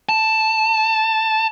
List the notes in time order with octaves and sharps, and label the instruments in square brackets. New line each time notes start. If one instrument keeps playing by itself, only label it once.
[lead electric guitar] A5